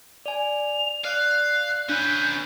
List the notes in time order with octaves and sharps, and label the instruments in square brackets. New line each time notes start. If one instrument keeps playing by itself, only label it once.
[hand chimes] D5 G#5 [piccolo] F7
[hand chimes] D5 [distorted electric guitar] F5 [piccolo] F#6
[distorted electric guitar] C#4 B4 [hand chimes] D4 F#6 [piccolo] G6